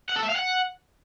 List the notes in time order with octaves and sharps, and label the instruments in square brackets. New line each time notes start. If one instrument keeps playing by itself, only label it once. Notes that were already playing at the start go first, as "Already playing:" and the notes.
[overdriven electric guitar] F#5
A4
E5
F5
F#5